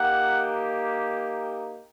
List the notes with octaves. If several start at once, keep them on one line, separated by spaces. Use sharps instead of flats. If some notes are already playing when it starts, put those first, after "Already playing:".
Already playing: A#3 D#4 G4 F#5